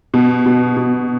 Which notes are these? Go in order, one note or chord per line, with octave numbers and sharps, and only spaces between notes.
B2
B2
B2